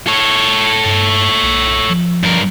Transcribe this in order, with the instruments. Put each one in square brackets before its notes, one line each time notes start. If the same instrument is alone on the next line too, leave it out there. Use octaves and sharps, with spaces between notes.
[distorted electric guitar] A4 C#5
[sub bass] G2
B1
F3
[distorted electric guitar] G2 A#4